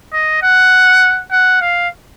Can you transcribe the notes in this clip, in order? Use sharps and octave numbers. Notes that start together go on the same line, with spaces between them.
D#5
F#5
F#5
F5